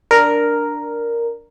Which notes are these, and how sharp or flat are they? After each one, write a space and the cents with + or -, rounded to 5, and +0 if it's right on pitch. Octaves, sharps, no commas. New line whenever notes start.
D4 +0 A#4 +0